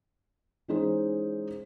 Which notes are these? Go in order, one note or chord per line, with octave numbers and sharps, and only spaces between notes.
E3 G#3 C#4 D#4 G#4 C5